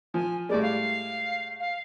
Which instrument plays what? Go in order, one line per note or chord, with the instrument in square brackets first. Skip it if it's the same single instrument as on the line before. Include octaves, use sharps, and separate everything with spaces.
[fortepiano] F3 [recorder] G#5
[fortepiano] A2 G3 G#3 [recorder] D5
[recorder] F5
F5